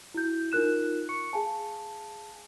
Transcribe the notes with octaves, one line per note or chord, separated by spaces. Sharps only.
E4 F#4 G6
D#4 F4 A#4 F#6 E7
C#6 C#7
G#4 F5 G#5 A5